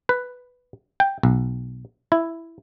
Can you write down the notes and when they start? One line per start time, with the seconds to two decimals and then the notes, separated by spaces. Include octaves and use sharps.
0.09 B4
1.00 G5
1.23 B1
2.12 E4